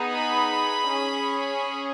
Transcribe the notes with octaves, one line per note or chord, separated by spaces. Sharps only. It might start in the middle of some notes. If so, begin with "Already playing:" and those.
Already playing: B3 D#4 G#4
B5
C#4 G#4